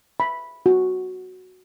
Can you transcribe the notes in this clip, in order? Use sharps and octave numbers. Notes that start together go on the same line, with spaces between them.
B5
F#4